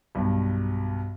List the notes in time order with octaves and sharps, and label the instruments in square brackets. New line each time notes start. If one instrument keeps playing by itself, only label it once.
[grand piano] B1 G2